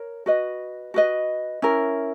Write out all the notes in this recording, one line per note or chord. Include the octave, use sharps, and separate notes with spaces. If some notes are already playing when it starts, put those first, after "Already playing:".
Already playing: A#4 C#5
F#4 B4 D#5
F#4 B4 D#5
C#4 E4 A#4